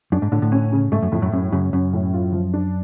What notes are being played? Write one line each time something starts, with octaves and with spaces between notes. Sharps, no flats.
F#2 D4
G#2
A2 D3
A2
C#4
C#3
G#2 A3
F#2
F2 A2
F#2
F#2 C#4
F#2 C#3
F#2 C#4
A2
F4
F3
D4